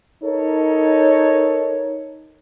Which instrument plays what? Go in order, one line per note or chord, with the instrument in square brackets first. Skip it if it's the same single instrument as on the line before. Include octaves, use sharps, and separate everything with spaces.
[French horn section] D#4 A4 A#4 C#5